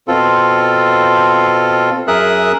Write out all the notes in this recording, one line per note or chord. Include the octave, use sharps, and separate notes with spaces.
B2 C4 F4 A4
F#2 G#4 A#4 E5 D#6 F#6